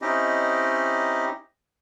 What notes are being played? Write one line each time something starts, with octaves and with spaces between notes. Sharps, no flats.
C4 C#4 D#4 E4 G4 D#5